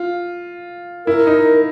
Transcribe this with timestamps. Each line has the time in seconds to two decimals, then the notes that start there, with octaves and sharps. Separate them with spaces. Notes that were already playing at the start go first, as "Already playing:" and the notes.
Already playing: F4
1.07 E4 A#4
1.27 D#4